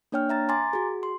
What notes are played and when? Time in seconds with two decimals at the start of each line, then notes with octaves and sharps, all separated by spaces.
0.12 A#3 D4 C#5 G5 F6
0.29 E5 A#5 A6
0.49 G#5 A#5 C6 D6 A6
0.73 F#4 G#4
1.03 C6